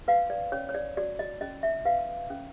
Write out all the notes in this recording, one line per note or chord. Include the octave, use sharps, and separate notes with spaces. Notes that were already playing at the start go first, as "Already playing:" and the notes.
B4 F5
D5
C#4 C#5
C#5
D5
F#4 D5
D#5
C#4 D#5
E5
B4 F5
C#4